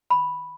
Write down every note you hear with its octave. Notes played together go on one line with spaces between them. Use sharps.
B5